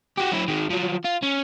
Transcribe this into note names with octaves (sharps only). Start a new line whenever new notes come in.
F#4 G4
F#3 E4
D#3 G#3
F3 F#3
F4
C#4